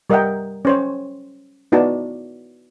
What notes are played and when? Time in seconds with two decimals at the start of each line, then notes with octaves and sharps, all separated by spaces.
0.10 G3 A#4 D#5 E5 F#5 G5
0.65 C#4 C5 C#5
1.72 B3 D#4 E4 F#4 D5 A5